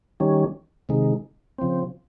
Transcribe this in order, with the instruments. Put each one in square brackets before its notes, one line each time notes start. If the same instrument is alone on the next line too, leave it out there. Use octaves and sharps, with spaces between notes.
[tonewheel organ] D#3 G3 C#4
C3 D#3 G#3
C#3 F3 C4